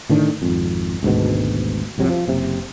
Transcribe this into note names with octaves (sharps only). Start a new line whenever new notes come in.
A2 D3 D#3 D4
G#1 F2
G#1 D2 G#2 B2
C2 F2 C3 F#3
F3
F#1 C3